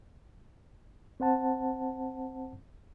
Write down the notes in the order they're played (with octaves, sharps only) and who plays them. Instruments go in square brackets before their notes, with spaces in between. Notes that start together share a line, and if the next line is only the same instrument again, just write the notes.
[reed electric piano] C4 C5 F#5 A5